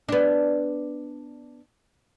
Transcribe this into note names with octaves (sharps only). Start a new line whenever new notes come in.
B3 D4